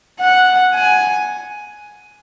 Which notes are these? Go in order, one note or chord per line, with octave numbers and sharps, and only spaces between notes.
F#5
G#5